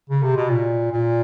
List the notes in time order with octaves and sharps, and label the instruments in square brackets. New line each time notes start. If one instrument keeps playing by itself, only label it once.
[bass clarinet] C#3
C3
B2
A#2
A#2